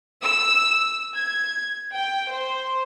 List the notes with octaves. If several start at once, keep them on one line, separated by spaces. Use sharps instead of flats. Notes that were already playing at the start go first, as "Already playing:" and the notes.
E6
G#6
G5
C5